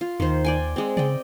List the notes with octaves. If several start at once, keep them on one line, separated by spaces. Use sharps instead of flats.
F4
D#2 D#3 C5
D5 G5 G#5
G#3 C4
C#3 D5 D#5 G5